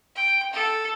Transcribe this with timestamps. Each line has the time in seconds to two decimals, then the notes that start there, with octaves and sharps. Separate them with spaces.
0.15 G5
0.53 A4